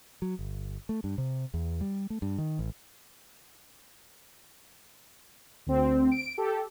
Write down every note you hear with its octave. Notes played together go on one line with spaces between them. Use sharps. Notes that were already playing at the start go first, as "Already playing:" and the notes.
F#3
G1
A3
G2
C3
E2
G3
A3
G2
D#3
A1
D2 C4
D7
G4 A4